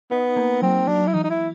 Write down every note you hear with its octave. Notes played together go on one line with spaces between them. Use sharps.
B3 D#4
A#3
F#3 C4
F#3 D4
E4
E3 D#4
D#4
E4